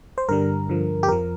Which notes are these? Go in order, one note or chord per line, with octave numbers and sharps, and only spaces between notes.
C5
G2 D3 G3 A#4
G2 D3 F3
G4
F2 F3 A#4